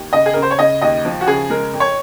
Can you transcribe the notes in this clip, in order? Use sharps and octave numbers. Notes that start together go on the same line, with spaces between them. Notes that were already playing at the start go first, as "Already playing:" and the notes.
Already playing: D#2
C#3 D#5
G#4
C#3 A#4
C5
C#5
C#3 D#5
D#2 D#5
F3
F#4
C#3 G#4
G#3 A#4
F2
C#5